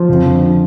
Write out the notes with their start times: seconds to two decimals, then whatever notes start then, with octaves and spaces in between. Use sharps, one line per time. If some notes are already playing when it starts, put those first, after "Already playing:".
Already playing: F3
0.09 F2
0.25 D3